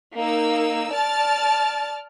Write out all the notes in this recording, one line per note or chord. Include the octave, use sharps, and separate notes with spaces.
A#3 D#4 E6
D5 A5 F6 A6